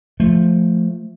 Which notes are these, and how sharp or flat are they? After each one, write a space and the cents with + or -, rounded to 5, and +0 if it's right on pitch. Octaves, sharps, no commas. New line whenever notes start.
F3 +0 A3 +0